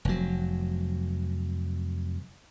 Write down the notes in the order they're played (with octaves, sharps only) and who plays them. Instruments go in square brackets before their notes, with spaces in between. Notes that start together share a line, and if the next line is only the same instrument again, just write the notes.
[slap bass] F1 F#3